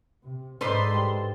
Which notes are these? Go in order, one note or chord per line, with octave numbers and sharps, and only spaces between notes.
C3
G#2 D4 D#4 A4 B4 C5 C6
G3